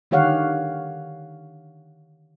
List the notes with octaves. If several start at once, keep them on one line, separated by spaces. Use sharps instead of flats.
D3 D#3 G4 C#5 F5 F#5